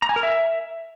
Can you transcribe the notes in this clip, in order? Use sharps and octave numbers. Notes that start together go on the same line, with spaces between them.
A#5
G#5
A#4
E5